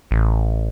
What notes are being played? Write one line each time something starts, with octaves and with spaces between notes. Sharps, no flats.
A1